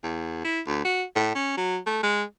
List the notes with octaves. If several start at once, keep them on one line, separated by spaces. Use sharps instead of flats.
E2
E4
D2
F#4
A2
C#4
F#3
A3
G#3